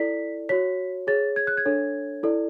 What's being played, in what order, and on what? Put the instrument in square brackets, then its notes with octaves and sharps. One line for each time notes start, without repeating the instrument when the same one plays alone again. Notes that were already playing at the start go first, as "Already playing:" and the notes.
Already playing: [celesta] E4 A4 D5 B6
F#4 C#5 B6
G#4 C#5 A6
G#6
F#6
G#6
D4 A4 C#5
E4 A4 D5